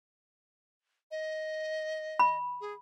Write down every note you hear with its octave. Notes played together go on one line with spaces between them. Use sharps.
D#5
B5
G#4